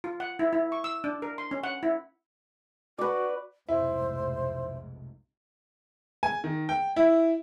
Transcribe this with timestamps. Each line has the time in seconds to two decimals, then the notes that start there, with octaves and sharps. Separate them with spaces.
0.04 F4
0.20 F#5
0.39 E4
0.53 E4
0.72 C#6
0.84 E6
1.04 D4
1.22 A#4
1.38 C6
1.51 C#4
1.63 F#5
1.83 E4
2.98 F#4 B4 D5
3.68 F1 B1 G#2 E4 C5
6.23 G#5
6.44 D#3
6.69 G5
6.96 E4